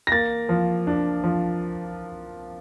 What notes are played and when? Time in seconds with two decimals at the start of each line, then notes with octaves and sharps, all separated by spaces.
0.07 A#6
0.12 A#3 A6
0.49 F3
0.87 D4
1.24 F3